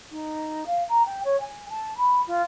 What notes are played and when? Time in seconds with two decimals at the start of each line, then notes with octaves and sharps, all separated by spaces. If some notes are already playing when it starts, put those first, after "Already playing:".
0.12 D#4
0.66 F5
0.89 A#5
1.06 G5
1.25 C#5
1.40 G#5
1.70 A5
1.97 B5
2.27 F4